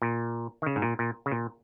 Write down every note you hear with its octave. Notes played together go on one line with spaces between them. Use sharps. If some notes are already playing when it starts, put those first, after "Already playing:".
A#2
D#3
C#3
G#2
A#2
A#2
C#3
A#2